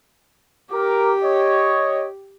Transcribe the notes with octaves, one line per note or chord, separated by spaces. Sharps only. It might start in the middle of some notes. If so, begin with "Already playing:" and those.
G4 A#4 D6
C#5 D#5